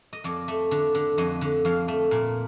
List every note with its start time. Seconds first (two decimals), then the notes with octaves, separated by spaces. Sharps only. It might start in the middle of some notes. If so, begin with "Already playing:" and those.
0.13 D#5
0.24 F2 D5
0.48 A3
0.71 D3
0.95 D3
1.18 F2 D#5
1.41 D3
1.65 F2 F5
1.88 A3
2.11 A#2